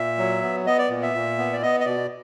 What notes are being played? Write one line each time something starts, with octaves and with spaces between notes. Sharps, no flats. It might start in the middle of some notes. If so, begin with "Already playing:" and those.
Already playing: A#2 E5
F#3
B3
B3 D#5
D5
A#2
E5
A#2
B3
D5
B3 D#5
D#5
B2 D5